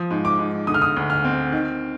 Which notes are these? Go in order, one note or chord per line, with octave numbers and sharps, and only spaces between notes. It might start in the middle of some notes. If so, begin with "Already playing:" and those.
Already playing: F3 D#6
G#2
D6
G#2
D3 D#6
F6
D#6
D2
F6
C4
D#3